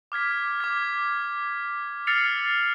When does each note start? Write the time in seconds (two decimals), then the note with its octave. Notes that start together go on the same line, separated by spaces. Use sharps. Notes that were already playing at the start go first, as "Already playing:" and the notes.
0.12 D6 F6 G#6 B6
0.60 D6 G#6
2.07 E6 F6 A6 C7 C#7 F7